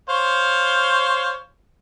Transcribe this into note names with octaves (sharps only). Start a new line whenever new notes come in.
C5 C#5 F5